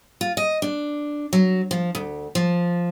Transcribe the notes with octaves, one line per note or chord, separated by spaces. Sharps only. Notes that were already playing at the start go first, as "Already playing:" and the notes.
F4
D#5
D4
F#3
F3
D2
F3